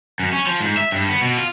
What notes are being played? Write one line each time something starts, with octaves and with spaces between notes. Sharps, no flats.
F#2
C#4
F3
G#2
E5
G2
B3
B2
F4